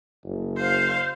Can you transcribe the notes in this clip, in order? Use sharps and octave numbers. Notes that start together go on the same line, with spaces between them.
F#1
C5 F5